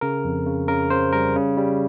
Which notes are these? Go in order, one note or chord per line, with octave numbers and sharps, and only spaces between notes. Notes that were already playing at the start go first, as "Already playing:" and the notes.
C#3 A#4
F2
C#3
C#3 A#4
C#3 C5
G3 A#4
C#3
G3